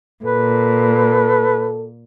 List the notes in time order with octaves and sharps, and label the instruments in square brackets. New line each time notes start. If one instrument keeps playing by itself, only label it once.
[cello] A#2 [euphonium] A4 [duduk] B4